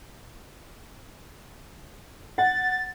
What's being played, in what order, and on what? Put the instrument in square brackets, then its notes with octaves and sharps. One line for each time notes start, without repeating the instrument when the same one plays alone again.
[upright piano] F#5 [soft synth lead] A6